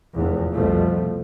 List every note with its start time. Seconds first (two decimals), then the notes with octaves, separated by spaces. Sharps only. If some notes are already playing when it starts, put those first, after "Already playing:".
0.15 F1 E2
0.52 C2 F2 B2 F3 A3